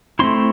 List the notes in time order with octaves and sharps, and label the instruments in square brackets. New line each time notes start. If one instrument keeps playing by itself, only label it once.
[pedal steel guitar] A3 C4 E4 C6